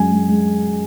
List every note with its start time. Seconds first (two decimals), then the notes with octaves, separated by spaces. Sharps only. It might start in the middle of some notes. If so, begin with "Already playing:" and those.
Already playing: F#2 G#3 G#5
0.12 G#3
0.29 G#3